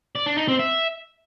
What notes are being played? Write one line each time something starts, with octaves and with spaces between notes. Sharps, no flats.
D5
D4
D#4
C4
E5